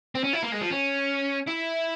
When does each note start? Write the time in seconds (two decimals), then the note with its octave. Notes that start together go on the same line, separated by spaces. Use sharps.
0.15 C4
0.24 C#4
0.33 E4
0.43 A#3
0.52 G#3
0.61 F3
0.70 C#4
1.48 E4